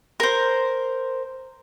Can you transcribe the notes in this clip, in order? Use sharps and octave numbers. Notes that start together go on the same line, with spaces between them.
A#4 C5